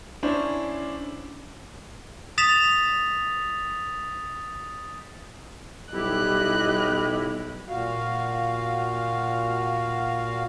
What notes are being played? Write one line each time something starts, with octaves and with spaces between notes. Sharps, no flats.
C#4 D4 E4 C5
D#6 A6 B6 E7 F7
B1 G3 E4 G4 D#5 F#6
A#2 F#4 F5